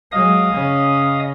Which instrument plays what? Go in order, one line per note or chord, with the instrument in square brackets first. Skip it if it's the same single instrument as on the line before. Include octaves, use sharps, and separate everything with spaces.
[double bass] F#3 G#3 [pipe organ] D#5 F5 D#6
[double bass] C#3 C#4